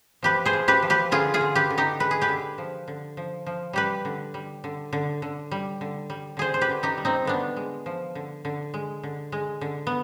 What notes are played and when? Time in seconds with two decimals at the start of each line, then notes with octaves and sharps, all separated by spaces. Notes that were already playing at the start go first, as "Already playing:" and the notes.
0.22 F3 G4 B4
0.45 G#4 C5
0.53 F3
0.68 G4 B4
0.82 F3
0.90 G4 B4
1.11 D3 F4 G#4
1.34 F4 G#4
1.41 D3
1.55 G4 B4
1.70 D3
1.78 D#4 G4
2.00 G#3 B4
2.11 G#4
2.21 G4 B4
2.29 D3
2.58 F3
2.88 D3
3.17 F3
3.46 F3
3.73 G3 G4 B4
4.05 D3
4.34 G3
4.64 D3
4.93 D3
5.22 D3
5.51 G3
5.81 D3
6.10 G3
6.37 D3 G#4 C5
6.54 C5
6.61 G4 B4
6.69 D3
6.83 D#4 G4
6.97 G3
7.05 C4 D#4
7.25 D3 B3 D4
7.56 G#3
7.86 F3
8.15 D3
8.45 D3
8.74 G#3
9.03 D3
9.32 G#3
9.61 D3
9.87 B3